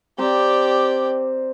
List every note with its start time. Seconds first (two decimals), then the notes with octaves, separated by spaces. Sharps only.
0.18 C4 G4 C5 D5 A#5